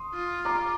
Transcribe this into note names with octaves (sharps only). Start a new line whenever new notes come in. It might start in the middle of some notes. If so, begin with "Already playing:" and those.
Already playing: C6 D#6
F4
A#5 D6